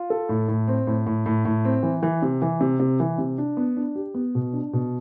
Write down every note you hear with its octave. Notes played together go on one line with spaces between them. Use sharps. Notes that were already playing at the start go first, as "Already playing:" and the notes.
Already playing: F4
A4
A2
A2
C4
A2
A2
A2
A2
C4
E3
E3
C3
E3
C3
C3
E3
C3
D4
B3
D4
G4
B3
B2
D4
B2